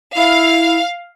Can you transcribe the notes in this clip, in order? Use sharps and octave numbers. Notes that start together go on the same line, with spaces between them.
E4 F5